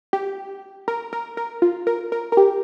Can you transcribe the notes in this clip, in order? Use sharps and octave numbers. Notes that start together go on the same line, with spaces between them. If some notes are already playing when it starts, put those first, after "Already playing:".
G4
A#4
A#4
A#4
F4
A#4
A#4
A#4
G4